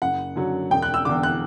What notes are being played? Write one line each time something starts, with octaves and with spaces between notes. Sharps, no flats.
F#1 F#5
F#2 D3 F#3
E1 G5
F#6
E6
E2 D3 D6
F#6